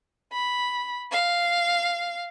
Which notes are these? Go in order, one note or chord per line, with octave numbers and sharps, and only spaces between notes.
B5
F5